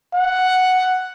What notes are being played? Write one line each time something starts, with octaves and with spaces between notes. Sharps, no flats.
F#5